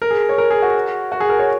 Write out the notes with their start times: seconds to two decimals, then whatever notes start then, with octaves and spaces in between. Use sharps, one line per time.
0.02 A#4
0.11 G#4
0.29 C#5
0.38 A#4
0.51 G#4
0.62 F#4
1.12 F#4
1.20 G#4
1.29 A#4
1.39 C#5